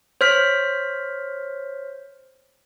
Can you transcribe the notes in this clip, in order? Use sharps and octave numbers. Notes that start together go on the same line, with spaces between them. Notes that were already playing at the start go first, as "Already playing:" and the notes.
C5 C#5 F6 B6